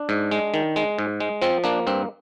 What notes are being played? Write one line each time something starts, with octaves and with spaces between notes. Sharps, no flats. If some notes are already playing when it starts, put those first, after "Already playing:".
Already playing: D4
G#2
G#3
D#3
G#3
G#2
G#3
F3 C4
A#3 D4
G2 C4